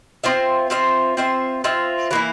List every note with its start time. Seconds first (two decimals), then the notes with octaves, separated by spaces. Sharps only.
0.24 C4 F4 C5 E5
0.70 C4 F4 C5 E5
1.17 C4 F4 C5 E5
1.64 C4 F4 C5 E5
2.11 E3 A#3 E4